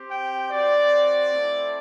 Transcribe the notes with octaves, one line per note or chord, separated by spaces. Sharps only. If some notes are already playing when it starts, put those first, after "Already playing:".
Already playing: C4 G4
G5
C4 F#4 D5
A3 C4 E4